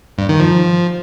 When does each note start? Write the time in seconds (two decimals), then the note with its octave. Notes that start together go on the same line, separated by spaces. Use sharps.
0.18 G2
0.29 D#3
0.40 F3